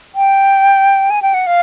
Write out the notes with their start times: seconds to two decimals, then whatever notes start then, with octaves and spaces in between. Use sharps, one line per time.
0.15 G5
1.10 G#5
1.22 G5
1.34 F#5
1.46 F5